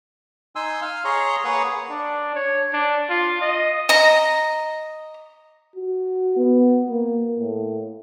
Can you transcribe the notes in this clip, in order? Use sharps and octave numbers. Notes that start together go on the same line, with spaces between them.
D#4 G#5 C6 E6
F5
G#4 C#5 A#5 C6
A#3 G#4 B4 C#5 F#5
D4
C#5
D4
F4
D#5
D#5 A#5
F#4
B3
A#3
A2